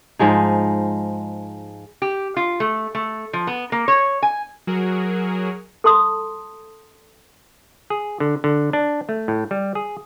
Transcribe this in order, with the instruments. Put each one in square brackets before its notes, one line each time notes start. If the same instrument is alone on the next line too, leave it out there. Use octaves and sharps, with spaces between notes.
[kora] G#2 F3 G#3 D#4
[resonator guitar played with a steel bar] G4
F4
A3
A3
F3
B3
A#3
C#5
G#5
[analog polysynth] F#3 F#4 G#4 A#4
[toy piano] A4 A5 C6 D#6
[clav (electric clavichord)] G#4
D3
D3
D4
A3
A2
G3
G#4